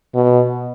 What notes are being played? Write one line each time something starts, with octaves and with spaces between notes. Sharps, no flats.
B2